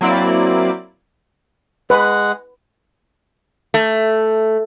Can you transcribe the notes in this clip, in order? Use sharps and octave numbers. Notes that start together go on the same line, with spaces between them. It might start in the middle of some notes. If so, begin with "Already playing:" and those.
F#3 A#3 C4 E4 D5
G#3 B4 F#5
A3